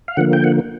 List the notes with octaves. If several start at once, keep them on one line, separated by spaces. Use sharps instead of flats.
F5
D3 F3 A#3 F#5
G5
F#5